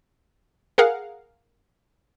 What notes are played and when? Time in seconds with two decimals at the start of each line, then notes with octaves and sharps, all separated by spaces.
0.78 G#4 A#4 F5 F#5